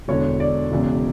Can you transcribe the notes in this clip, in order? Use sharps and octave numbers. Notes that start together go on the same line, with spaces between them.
E1 E2 D3 C#5
D5
E1 E2 C#3